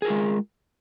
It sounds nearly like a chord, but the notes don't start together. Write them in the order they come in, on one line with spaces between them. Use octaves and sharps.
G#4 A#4 F4 G#3